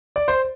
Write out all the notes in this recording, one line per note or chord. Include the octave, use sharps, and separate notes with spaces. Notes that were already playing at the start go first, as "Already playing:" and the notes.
D5
C5